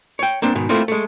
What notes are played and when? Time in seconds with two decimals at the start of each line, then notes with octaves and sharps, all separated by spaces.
0.19 C#5 G5
0.42 A#3 C4 D4
0.55 G#2 B2 D#3
0.69 A3 A#3 C4 E4 F4
0.88 G#3 A3